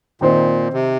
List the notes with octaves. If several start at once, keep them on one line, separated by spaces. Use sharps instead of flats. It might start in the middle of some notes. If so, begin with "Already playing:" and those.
A#2 D#3 C4 D#4 C5
C3